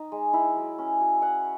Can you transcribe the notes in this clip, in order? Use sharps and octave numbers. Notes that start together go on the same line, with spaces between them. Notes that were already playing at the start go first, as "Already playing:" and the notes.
Already playing: D#4
G#3
E4
F#3
C#4
F#3
E4 F#5